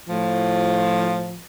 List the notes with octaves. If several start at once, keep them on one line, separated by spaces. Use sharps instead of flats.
A2 F3